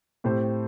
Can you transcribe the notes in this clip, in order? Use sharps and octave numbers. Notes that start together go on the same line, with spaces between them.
A2 A3 C4 G4 C5